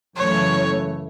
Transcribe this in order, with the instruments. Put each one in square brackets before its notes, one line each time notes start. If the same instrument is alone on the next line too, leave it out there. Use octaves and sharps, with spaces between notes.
[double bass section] F#2 C#3 E3 A3 [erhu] C#5